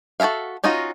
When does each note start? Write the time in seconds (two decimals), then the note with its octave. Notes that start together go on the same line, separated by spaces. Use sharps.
0.20 F#4 A4 A#4 E5 F5
0.64 C#4 D#4 F4 F#4 D#5